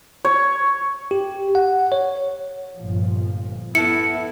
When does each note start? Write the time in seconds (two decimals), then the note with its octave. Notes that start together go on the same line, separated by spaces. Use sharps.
0.25 C#5
1.11 G4
1.55 F#5
1.92 C#5
2.76 G1 A#2 F3
3.75 B3 E4 A4 C#7